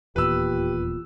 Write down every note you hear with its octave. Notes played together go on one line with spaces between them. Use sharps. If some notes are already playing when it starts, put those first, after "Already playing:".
D#1 E2 A#2 F4 G4 B4 E6